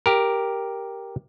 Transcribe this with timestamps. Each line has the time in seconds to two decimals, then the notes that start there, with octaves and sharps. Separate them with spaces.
0.06 G4 A#4